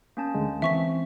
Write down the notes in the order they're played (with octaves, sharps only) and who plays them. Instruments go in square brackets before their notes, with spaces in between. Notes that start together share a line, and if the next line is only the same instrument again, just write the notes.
[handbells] A#3 C#4 A5
[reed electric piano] D2 D3 G#3
[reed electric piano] E3 C4 [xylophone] E5 C#6 B6